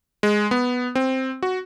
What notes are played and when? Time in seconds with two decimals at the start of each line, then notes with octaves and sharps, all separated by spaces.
0.23 G#3
0.51 B3
0.95 C4
1.43 F#4